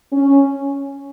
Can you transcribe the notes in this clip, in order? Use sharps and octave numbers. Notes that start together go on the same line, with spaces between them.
C#4